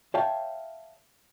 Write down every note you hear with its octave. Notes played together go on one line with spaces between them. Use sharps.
C#5 E5 F5 G5 A5